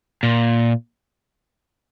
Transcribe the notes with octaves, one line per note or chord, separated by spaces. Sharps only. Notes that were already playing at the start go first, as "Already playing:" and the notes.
A#2